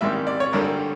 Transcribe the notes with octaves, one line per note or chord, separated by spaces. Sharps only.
A1 G#2 D#3 G3 C4 E5
D5
C#5
G#1 G2 D3 G3 A#4